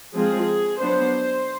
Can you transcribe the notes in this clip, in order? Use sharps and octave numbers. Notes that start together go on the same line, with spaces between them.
F3 G#3 C4 G#4
F#3 B3 D4 C5